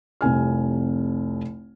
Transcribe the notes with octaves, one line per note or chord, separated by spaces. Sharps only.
F1 C2 G#5 F6